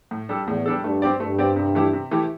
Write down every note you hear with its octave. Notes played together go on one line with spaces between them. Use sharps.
A2
G3 D4 A4
E2 A2
G3 D4 A4
G2 A3
C4 G4 D5
G2 A3
C4 G4 D5
C3
E3 A3 E4 G4
C3
E3 A3 E4 G4